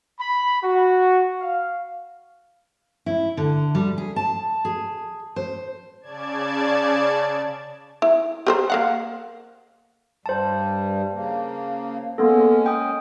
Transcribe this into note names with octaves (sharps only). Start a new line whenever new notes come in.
B5
F#4
F5
E4
D3
G3
G#4
A5
G#4
C5
C#3 D5 A5 G#6
E4
G4 B4 C5
A#3 F5 F#5
G2 G3 C5 A5
C#3 A#3
G#3 A#3 B3 C#4 A4
G5 D#6